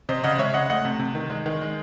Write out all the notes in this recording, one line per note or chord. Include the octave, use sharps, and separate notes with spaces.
C3 C5 D#5
C#3 D#5 F#5
G#3 C#5 E5
C#3 D#5 F#5
A3 D#5 F#5
C3
C3
D#3
G#3
D#3
G#3